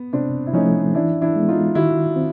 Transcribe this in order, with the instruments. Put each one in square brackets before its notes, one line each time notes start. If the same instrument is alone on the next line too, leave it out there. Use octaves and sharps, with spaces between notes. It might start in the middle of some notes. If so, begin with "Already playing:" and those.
Already playing: [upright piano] B3
[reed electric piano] C3 [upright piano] C4 D4
[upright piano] E4
[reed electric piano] F3 A3 [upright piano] C#4 D#4
[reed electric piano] E3 [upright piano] D4 E4
[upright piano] D4 E4
[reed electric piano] G#3 B3
[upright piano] D#4 F4
[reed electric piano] D#3 [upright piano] E4 F#4
[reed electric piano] C4